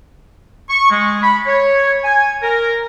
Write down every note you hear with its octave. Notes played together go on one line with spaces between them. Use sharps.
C#6
G#3
B5
C#5
G#5
A#4